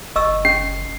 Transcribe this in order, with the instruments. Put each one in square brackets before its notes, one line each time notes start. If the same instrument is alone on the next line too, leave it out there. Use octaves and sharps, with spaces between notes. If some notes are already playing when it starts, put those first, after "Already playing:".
[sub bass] F#1 [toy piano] D#5 C#6 E6
[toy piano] C#4 [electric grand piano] C7